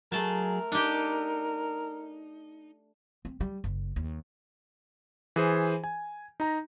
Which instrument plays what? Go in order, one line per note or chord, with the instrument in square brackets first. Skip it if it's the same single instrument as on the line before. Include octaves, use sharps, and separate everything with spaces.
[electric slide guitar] F#3 G#4 [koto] A3 A5 [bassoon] A#4
[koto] D4 G4 [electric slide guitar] D#4
[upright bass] C4
G3
F#1
D#2
[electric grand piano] E3 G#4 C5
G#5
D#4 A#5